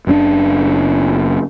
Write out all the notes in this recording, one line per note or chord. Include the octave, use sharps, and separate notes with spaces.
F#1 C#3 C4 D4